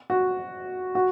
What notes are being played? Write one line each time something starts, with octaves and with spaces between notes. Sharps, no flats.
F#4
F#4